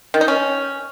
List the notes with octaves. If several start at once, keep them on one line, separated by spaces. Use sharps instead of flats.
D#3
D#4
C#4